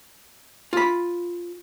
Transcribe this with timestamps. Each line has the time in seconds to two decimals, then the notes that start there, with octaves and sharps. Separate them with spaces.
0.73 F4 B5